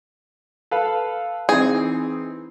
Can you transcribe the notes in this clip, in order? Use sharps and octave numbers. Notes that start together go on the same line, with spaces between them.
A4 B4 F5
E3 C4 D#4 G#4